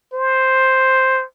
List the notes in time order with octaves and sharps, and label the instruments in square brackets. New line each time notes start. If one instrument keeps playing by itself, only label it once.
[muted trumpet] C5